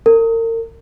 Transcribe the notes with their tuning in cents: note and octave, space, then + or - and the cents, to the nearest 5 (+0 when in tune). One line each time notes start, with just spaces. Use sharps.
A#4 -40